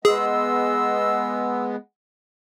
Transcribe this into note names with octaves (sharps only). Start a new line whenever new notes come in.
G#3 B3 G#4 D#5 C6 E6